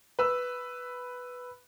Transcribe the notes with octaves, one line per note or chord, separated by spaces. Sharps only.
B4 E6